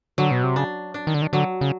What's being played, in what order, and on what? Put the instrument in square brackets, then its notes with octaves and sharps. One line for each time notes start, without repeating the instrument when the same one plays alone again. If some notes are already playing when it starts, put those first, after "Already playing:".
[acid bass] D3 [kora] F#3
[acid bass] B2
C3
[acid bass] C#3 [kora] D4
[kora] D4
[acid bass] D#3
D3
D#3
[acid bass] D3 [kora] F#3
[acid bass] C#3